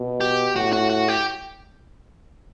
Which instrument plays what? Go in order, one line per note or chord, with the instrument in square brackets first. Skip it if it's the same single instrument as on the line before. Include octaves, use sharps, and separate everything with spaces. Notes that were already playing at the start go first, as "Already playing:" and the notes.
Already playing: [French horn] B2
[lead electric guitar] G4
[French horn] A2 [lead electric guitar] F#4
[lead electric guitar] F#4
F#4
G4